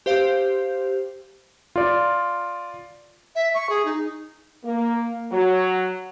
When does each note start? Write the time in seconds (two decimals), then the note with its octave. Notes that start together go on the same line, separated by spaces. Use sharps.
0.06 G4 C5 F5
1.76 F4 D5
3.35 E5
3.55 C#6
3.70 G#4
3.85 D#4
4.65 A#3
5.32 F#3